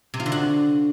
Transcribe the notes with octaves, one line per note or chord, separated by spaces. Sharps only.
C3
F4
D3
F#4